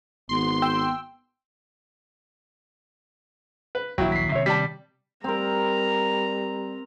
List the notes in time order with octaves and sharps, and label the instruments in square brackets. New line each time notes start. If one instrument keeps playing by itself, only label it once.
[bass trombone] G#1 [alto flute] B3 [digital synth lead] C6
[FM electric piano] G5 E6
[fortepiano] B4
[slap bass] D#1 A#1 [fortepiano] F#3 E4 [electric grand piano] G5
[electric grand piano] B6 C7
[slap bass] C3 D#3 C4 [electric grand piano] C#5 E5
[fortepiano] G3 D5 A5 [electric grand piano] B6
[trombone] G3 [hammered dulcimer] C4 A#4 [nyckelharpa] A#5